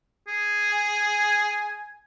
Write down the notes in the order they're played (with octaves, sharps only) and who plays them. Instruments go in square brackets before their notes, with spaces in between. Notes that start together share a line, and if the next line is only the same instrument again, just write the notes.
[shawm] G#4
[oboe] G#5